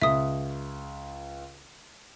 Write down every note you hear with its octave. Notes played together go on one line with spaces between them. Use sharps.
C#2 E5 D#6